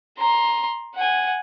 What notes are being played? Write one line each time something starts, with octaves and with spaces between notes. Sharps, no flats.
A#5 C6
F#5 G#5